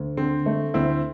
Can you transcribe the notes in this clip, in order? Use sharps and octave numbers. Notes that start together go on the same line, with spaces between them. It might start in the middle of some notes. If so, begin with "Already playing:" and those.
Already playing: D2
D3 C4
A3
D2 C4 E4